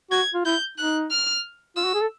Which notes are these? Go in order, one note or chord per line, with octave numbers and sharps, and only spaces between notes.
F#4 G#6
F4
E4 G6
D#4 F#6
F6
F4 E6
F#4
G#4
A4